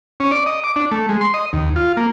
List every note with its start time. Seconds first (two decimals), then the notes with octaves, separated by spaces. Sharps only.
0.20 C#4
0.31 D5
0.46 D#5
0.64 D6
0.76 D4
0.91 A3
1.09 G#3
1.21 C6
1.34 D#5
1.53 D#2
1.76 F4
1.97 A#3